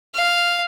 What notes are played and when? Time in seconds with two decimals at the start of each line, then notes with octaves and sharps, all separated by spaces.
0.14 F5